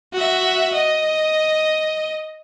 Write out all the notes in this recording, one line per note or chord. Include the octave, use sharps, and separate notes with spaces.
F#4 E5
D#5